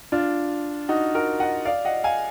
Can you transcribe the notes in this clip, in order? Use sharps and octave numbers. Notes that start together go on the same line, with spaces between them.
D4 F4
D#4 F#4
F#4 A#4
D#5 F#5
D5 F5
D#5 F#5
F5 G#5